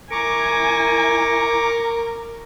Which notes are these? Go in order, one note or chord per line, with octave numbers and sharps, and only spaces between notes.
E4 A#4 G#5 A#5 C#6 D6